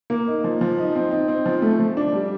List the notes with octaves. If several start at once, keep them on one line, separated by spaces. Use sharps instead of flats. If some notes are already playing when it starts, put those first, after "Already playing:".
A#3
D#4
F3
F3
D#4
C4
D#4
C4
F3
A3
F3
D4
G3